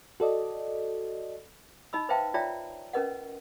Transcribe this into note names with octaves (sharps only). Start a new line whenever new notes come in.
F#4 A4 D5 D#5
D#4 D#5 B5 E6
B4 C5 E5 F5 G5 A5
F4 C#5 D5 E5 G5 A#5
C#4 A#4 B4 D#5 F#5